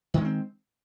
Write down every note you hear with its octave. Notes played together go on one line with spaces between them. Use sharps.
D#3 G#3 C4 C#4